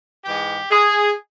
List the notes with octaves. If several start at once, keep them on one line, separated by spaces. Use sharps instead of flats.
G#2 E3 G#3 G4
G#4